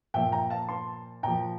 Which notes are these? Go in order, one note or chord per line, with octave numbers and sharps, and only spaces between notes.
A#2 F3 E5 G5
G5 A#5
F5 A5
A5 C6
A#2 F3 G5 A#5